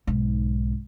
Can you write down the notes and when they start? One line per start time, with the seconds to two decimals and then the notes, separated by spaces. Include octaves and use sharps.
0.07 B1 G#2